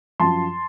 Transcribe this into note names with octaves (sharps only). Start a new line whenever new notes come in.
F#2 F3 A5 C6